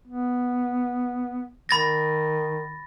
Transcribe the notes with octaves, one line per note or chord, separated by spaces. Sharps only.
B3
D#3 B5 A6 A#6